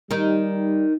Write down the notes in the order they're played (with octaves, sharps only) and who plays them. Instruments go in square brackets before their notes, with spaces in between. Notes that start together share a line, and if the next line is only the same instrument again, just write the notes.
[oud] D#3 D#4 [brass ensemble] G3